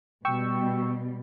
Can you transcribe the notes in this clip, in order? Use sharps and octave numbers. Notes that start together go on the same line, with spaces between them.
B2 G3 G5 C#6 E6